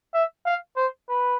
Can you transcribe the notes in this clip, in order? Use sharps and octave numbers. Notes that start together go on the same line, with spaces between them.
E5
F5
C5
B4